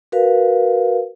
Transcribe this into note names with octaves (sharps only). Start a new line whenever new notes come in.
F#4 A#4 B4 F5